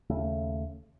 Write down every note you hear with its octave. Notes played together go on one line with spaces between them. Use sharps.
D#2 C#3 A3